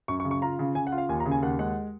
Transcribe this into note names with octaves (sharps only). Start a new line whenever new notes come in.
F#2 C#6
C#6
C#3
C#6
F4 A#5
C#3
C#3 G#5
F#5
F4
F5
D#2 G#5
A#5
C#3
G#5
D#2 F#5
G#3 F#5